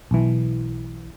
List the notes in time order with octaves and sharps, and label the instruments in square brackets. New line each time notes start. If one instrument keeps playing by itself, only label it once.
[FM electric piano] B1 E3